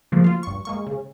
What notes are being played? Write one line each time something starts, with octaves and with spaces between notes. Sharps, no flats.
C#3 F3 A3 A#3
F4 F5
G2 C#6
G#3 A#3 C#6
C#3